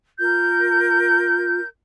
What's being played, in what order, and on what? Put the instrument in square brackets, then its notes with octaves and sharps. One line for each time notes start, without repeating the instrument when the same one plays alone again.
[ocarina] F4 [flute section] A#4 G6